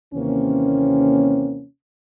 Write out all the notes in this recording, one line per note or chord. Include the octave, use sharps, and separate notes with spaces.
D#2 C3 E3 A#3 C4 C#4